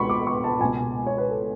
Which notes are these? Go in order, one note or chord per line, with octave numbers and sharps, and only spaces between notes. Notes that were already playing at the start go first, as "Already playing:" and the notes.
Already playing: C#2 B2 B5 C#6
D6
C#6
A5
C#2 B2 G#5
C#5
B4
A4